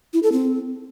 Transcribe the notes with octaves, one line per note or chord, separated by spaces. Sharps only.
E4
A4
C4